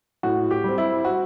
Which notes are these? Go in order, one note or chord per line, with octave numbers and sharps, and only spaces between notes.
A2 F#4
G4
G3 C4
E4
F#4